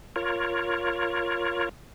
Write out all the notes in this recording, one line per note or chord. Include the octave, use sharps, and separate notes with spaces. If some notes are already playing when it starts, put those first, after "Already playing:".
F4 A#4 C#5